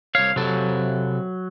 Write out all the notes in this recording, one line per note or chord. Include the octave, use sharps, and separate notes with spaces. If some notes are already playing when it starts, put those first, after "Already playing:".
C2 C#5 F5
C3 F#3 A4